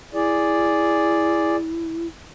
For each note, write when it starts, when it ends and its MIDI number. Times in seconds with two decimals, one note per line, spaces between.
0.13 2.07 64
0.13 1.56 68
0.13 1.56 74